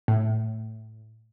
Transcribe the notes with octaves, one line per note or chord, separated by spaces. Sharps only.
A2